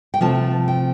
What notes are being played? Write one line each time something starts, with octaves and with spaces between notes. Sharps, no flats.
G5
C3 F3 A3 C4 A5
G5